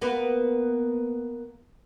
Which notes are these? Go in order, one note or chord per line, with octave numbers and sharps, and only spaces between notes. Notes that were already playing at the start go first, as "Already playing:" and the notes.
A#3 B3 B4